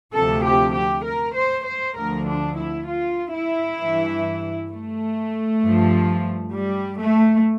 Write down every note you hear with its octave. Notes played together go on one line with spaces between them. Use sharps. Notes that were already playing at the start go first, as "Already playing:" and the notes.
D2 C3 F3 A4
G4
G4
A#4
C5
C5
D2 D3 F3 A#4
D4
E4
F4
E4
G2 E3
A3
G2 F3
G3
A3